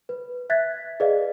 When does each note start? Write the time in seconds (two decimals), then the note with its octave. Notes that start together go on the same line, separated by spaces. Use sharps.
0.09 B4
0.50 E5 F#6 G#6 A6 B6
1.00 G#4 B4 D5 D#5 F5